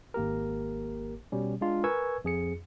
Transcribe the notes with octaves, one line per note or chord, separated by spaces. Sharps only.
G#1 A#3 G4 A#4
B2 G3 C#4
G#3 D4 F4
A#4 B4 G#5 C#6 E6 G#6
F2 G#4 C#7